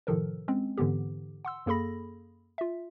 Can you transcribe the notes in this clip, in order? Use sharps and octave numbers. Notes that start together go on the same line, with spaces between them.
A2 C3 D#3 F3 A4 A#4
G#3 C4 C#4
G#2 D3 E3 B3 G4
F#5 C6 E6
F#2 A#3 G#4 A4 B5 A#6
F4 E5